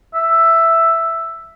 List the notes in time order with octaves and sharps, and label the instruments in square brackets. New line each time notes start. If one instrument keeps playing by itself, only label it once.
[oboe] E5